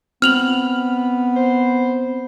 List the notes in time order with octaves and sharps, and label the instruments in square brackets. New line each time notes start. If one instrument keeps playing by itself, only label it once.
[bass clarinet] B3 [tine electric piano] C4 [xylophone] F6 F7 F#7
[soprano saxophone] C5